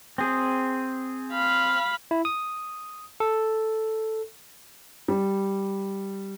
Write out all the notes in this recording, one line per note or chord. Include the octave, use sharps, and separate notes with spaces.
C4 G#4
F5 B5
E4
D#6
A4
G3